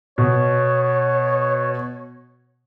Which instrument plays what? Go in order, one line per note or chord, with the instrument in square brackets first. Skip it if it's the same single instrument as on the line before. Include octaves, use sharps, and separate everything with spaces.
[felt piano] B2 [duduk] C#5